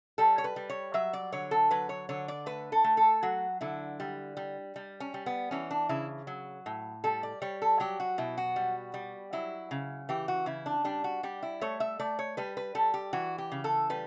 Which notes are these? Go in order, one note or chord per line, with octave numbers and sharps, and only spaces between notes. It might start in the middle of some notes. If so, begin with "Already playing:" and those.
G3 A4
C#5
B4
G3
C#5
F#3 E5
D5
D3 C#5
A4
F#3 B4
C#5
D3 C#5
D5
A3 B4
A4
A3
A4
F#3 F#4
D3 E4
G3
G3
G3
C#4
G3
B3
E3 C#4
D4
C#3 E4
F#3
A2
G3 A4
D5
G3 C#5
A4
F#3 G4
F#4
B2 E4
F#4
G3
G3
F#3 E4
C#3
E3 G4
F#4
C#3 E4
D4
G3 D4
F#4
G3 G4
E4
A3 C#5
E5
A3 D5
C#5
G3 B4
B4
G3 A4
G4
E3 F#4
G4
C#3
A4
G3 B4